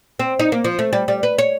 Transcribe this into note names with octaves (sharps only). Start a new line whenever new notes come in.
C4
D#4
A#3
F3
A3
G3
G3
B4
C#5